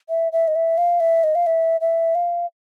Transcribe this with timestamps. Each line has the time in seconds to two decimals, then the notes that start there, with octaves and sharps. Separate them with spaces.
0.09 E5
0.32 E5
0.47 D#5
0.55 E5
0.78 F5
1.00 E5
1.23 D#5
1.35 F5
1.46 E5
1.81 E5
2.15 F5